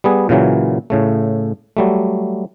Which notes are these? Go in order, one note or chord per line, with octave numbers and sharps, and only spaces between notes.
G3 B3 G#4
A#2 C#3 E3 F#3
A2 C#3 A3
F#3 G3 A3